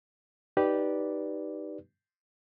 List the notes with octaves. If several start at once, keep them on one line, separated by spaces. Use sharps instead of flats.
D#4 G4 B4 D5